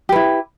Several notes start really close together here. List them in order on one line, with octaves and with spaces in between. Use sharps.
G4 B4 E4